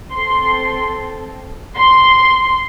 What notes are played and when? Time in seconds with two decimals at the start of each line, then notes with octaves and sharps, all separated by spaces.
0.12 C4 A4 C6
1.78 C6